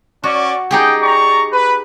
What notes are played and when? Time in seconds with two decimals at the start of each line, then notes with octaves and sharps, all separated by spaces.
0.24 C#4 F#4 D5
0.71 D#4 G4 G#4 G5
1.02 D5 A#5 C#6
1.52 B4